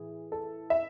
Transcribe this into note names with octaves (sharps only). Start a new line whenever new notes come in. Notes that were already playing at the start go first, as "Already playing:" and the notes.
Already playing: A2 E3 G#4
A4
E5